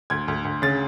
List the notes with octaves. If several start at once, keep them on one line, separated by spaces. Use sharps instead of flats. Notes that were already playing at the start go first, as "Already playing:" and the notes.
D2 G#6
D2
D2
C#3 A6